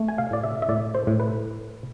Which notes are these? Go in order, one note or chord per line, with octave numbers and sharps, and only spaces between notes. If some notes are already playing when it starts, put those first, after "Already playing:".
Already playing: A3
G#5
F5
A2 D5
E5
E5
A2 D5
C5
A2
B4